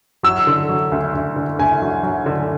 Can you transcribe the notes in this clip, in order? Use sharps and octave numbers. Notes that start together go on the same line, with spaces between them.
F#3 E6
D3
F#3
D2
D2
D3
D2 G#5
F#3
F#3
D3